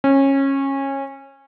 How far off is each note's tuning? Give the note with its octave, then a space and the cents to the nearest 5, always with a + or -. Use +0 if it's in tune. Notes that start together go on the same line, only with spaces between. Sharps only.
C#4 -20